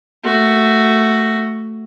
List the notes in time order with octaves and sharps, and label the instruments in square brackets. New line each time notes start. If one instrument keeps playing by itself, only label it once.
[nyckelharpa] A3 F#4